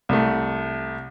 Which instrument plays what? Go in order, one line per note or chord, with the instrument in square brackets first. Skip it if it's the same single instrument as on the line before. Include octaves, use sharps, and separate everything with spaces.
[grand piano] C2 A3